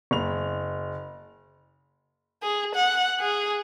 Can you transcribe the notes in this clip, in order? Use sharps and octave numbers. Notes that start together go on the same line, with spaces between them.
F#1 F7
G#4
F#5
G#4